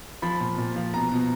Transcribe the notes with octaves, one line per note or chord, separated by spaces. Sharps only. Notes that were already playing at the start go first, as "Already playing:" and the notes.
F3 B5
A#2
A#2
F3
B2 A#5
B2